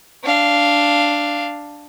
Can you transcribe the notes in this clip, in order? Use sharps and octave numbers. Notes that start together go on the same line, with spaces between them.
D4 F5